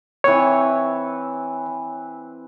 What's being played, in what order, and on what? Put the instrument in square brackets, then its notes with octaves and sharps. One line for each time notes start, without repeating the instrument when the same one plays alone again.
[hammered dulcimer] E3 C4 B4 [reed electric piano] C#5